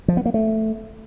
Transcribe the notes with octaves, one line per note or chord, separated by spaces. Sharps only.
F3
B3
A#3
A3